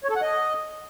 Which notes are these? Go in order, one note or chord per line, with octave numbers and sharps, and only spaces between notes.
C#5
A4
F#5
D#5